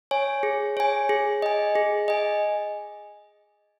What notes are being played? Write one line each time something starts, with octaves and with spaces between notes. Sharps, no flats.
C#5 G#5
G#4
C#5 G#5
G#4
D#5 G#5
G#4
D#5 G#5